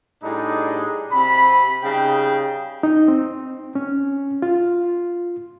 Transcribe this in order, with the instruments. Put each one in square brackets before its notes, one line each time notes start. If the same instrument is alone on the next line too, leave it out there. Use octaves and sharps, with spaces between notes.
[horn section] A2 G3 D4 D#4 G#4
C3 C4 B5
C#3 G3 D#4 G5
[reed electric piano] D#4
C4
C#4
F4